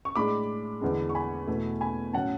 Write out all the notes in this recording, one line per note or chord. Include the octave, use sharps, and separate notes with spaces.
C#6
A2 G#3 D4 B5 D6
E2 D3 G#3
C#6
G#5 B5
E2 B2 A3
G#5 B5
A2 F#3 C#4 F#5 A5